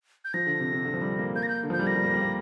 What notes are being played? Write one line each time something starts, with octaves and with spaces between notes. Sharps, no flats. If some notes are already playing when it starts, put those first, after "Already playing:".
G6
F3 A#6
D3
C3
C3
D3
F3
G3
A#3
A#3 G6
A#6
G6
D3
F3
G6
G3
A#3 A#6
G3
A#3
G3
A#3